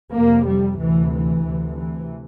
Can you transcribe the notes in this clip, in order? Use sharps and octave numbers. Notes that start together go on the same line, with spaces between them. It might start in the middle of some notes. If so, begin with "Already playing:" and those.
F2 C3 A#3
G3
D2 C3 E3
E3
D2 C3
E3